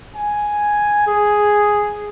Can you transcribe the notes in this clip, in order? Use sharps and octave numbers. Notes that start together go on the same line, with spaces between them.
G#5
G#4